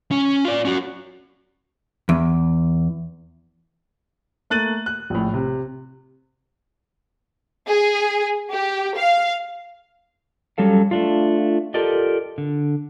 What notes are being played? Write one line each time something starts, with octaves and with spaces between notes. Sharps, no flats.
C#4
F4 D5
C#4 F#4
E2
A3 A#3 F#6 A6 D#7 F#7
F#6
A#1 A2
C3
G#4
G4
F5
F#3 G3 C#4 A4 F5
A3 D4 F4
F4 G4 A4 A#4 D5 D#5
D3